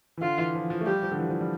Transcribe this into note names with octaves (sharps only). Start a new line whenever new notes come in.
E3
D3 F4
E3
F3
F3
A3
G3 G4
F3
D3
E3
F3
G3